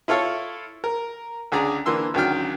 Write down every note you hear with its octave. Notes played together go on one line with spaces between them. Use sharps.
E4 F4 A4 C#5 F5
A#4
C#2 D3 G#4 D5 A#5
D3 E3 A#3 C6 E6
C#2 D3 D#3 F#3 G5 F6